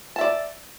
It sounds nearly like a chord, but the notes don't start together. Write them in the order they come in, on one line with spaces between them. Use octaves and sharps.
A5 E5 D5